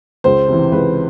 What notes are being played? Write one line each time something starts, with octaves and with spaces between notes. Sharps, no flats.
C#2 C5
C3 E3
C#2 B4